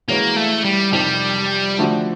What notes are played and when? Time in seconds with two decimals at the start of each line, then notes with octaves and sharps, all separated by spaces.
0.08 E3 G#3 A#3 C#4 F#4 B4
0.36 A3
0.65 G3
0.93 F2 C3 D#3 G3
1.78 D3 F3 A3 D4 F#4